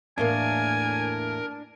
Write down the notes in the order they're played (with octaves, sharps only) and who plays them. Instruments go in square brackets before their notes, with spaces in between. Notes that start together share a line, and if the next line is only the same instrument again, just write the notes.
[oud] E2 A2 A#3 [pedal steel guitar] D4 [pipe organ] A#4 [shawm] G#5